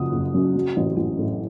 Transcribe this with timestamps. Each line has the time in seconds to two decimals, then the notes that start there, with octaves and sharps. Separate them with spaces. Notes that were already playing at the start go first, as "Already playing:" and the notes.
Already playing: F#1 F#2 F3 F#5 D#6
0.12 F#1
0.34 F#2
0.55 F#3
0.76 A1
0.97 A1
1.18 A2